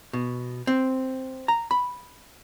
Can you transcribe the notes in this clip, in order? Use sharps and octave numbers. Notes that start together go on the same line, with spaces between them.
B2
C4
A#5
B5